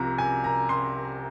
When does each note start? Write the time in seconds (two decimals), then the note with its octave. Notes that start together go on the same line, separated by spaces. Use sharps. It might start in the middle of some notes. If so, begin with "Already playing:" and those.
Already playing: C2 C3 F3 A#5
0.18 G#5
0.44 A#5
0.69 C6